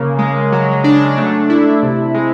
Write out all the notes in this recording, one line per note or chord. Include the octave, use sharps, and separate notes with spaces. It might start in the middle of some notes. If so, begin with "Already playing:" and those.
Already playing: C#3 A#3
G#3
F#3
D4
A3
E4
C3
G#3